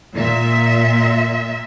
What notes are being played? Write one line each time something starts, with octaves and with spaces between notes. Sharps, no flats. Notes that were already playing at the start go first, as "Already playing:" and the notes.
A#2 E5